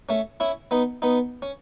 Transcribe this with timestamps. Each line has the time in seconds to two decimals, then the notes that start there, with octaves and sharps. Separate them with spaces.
0.09 A3 C#4
0.40 C#4 E4
0.71 B3 D#4
1.02 B3 D#4
1.42 C#4